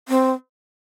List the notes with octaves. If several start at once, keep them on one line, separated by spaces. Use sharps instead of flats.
C4